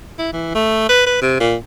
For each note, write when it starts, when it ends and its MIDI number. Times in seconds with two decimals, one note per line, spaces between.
0.18 0.31 64
0.33 0.53 52
0.55 0.88 57
0.89 1.03 71
1.06 1.19 71
1.22 1.39 48
1.40 1.55 46